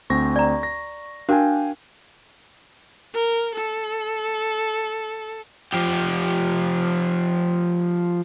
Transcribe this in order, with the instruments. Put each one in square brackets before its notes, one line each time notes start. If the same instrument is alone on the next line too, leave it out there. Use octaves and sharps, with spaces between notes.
[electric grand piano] D2 C4 A#6 [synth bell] C#6
[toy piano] D5 A#5
[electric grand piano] A#6
[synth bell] D4 [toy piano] F#4 A#4 [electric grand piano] F5 G5 G#5
[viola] A#4
A4
[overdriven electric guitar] F3 G4